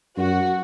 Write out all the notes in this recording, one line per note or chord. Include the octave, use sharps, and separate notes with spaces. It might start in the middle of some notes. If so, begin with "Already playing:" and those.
F#2 F#4